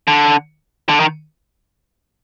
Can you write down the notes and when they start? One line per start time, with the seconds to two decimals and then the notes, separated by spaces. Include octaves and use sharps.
0.08 D3
0.89 D3
1.00 D#3